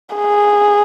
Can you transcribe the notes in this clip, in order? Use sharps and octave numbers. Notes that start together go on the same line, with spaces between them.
G#4